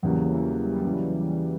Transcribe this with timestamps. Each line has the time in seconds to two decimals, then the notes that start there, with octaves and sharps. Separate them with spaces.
0.02 E2 C#3 F#3 G3 A#3
0.23 E3
0.63 E3 G3
0.84 C#3 E3 F#3 G3